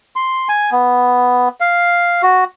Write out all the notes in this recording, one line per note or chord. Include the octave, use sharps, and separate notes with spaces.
C6
G#5
B3
F5
F#4